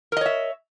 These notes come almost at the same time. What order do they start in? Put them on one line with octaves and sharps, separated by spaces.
A#4 D#5 C#5 E5